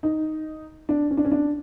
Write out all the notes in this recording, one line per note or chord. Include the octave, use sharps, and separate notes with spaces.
D#4
D4
C#4
D4
C#4
D4